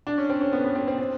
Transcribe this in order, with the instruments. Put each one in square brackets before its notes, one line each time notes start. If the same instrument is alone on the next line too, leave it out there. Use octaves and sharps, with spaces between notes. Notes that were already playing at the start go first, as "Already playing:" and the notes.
[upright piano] D4
C#4
C4
C#4
B3
B3
C4
C4
C4